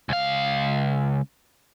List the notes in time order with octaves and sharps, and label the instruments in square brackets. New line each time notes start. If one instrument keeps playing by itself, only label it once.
[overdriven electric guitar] C#2 F5